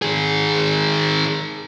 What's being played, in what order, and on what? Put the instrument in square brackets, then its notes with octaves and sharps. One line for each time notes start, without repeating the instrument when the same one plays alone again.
[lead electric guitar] D#3 G#4